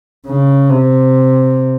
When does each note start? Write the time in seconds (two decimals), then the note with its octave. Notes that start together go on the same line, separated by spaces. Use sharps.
0.27 C#3
0.69 C3